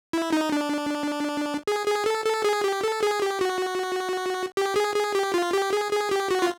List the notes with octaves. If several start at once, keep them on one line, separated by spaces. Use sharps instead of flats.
E4
D#4
D4
G#4
G#4
A4
A4
G#4
G4
A4
G#4
G4
F#4
G4
G#4
G#4
G4
F4
G4
G#4
G#4
G4
F#4
F4